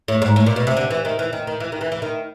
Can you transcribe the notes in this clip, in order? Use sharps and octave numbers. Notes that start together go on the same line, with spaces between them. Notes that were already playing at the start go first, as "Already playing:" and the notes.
A2
G#2
A2
A#2
B2
C3
D3
E3
D#3
E3
D#3
D#3
E3
D#3
E3
E3
D#3